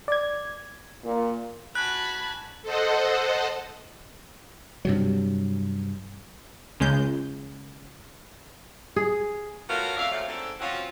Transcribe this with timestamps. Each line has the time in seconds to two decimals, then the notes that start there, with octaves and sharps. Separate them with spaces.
0.08 D5 G#6
1.04 A#2
1.75 F#4 G#5 A5 B5 F#6
2.63 A4 C5 D#5 F#5
4.85 G2 C3 F#3
6.80 C#2 C#3 G#3 G6
8.96 G#4
9.69 A3 B3 C#4 F4 F#4 A#4
9.97 F2 D5 E5 F5
10.12 A#2 F3 F#3 A3
10.28 G#2 D3 C4 A4
10.60 F3 C4 C#4 F4 F#4